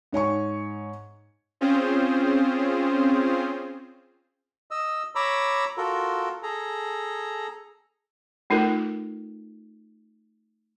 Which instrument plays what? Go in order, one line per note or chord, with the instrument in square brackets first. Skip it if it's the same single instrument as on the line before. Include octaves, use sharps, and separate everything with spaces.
[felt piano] G#2 C#5 G#5 C#6
[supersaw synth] C4 C#4 F4 G#4 C5
[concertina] D#5 E6
C#5 A#5 B5 D6 E6
F4 F#4 A4 A#4
G#4 A4 A#5
[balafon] A3 D#4 F4 A4 A#4